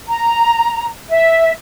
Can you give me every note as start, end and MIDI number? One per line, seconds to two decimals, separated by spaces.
0.08 0.86 82
1.11 1.51 76